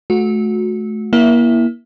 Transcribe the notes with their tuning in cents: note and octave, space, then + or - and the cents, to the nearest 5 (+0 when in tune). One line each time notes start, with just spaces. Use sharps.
A3 -30 F#4 -25
A#3 +30 E4 +0 E5 +0